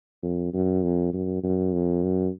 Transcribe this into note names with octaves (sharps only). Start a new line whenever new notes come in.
F2
F#2
F2
F#2
F#2
F2
F#2